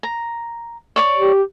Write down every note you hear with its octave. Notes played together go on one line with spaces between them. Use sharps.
A#5
C#5 D5 D6
G4